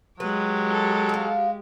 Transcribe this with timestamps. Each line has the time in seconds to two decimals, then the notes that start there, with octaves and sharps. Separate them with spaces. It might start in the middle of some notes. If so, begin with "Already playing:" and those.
0.20 F#3 G#3 G4 B4
0.72 A4
1.09 F#4 F5